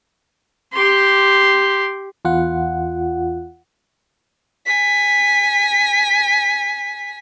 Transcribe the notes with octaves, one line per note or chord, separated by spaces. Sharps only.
G4 C6
E2 F4 F#5
G#5 B6